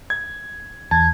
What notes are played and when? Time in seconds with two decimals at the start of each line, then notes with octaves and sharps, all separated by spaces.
0.10 G#6
0.91 E2 A5 G#6